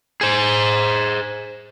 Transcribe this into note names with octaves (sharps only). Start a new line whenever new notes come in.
G#4 C5